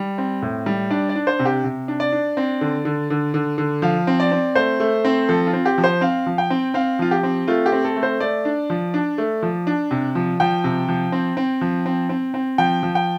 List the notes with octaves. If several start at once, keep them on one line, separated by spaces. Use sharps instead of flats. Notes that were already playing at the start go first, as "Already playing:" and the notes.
Already playing: G3
C4
A2
G3
D4 D5
D5
D4
C5
C3
G4
C3
D4
D5
D4
C4
D3
D3
D3
D3
D3
F3 F5
C4
D5
C4
A3 C5
A3
C4
F3 A4
F4
C4
G4
F3
C5
C4 F5
F3
G5
C4
C4 F5
F3 F4
G4
C4
A3 F4
G4
C4
A4
A3
C5
A3 D5
D4
F3
D4
A3
F3
D4
C3
F3
F3 G5
C3
F3
C4
C4
F3
C4
C4
C4
F3 G5
F3
G5